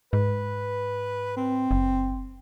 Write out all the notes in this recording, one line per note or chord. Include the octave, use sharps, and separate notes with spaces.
G#2 B4
C4
F#1